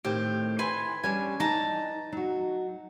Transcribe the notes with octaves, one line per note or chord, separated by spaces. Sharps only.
A2 D#3 C4 G4
E3 B4 G#5 C6
G3 B3 C#4 D4 G#5
E3 D4 D#4 A5 A#5
F#3 D#4 F#4